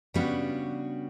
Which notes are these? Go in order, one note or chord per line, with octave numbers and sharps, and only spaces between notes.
C#3 G3 B3 D4 F#4